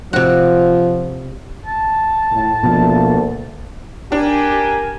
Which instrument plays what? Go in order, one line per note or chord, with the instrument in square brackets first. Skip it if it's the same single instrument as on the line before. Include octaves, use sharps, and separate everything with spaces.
[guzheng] C3 F#4 [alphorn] F3
[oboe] A5
[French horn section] A2
[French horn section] D2 A#3 [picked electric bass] B2 F3
[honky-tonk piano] D4 [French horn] G4 [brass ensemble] A#4 G#5